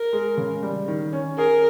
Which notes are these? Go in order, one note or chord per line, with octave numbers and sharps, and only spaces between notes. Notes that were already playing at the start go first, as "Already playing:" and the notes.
Already playing: A#4
G#3
C#3
G3
D#3
C#4
G#4 A#4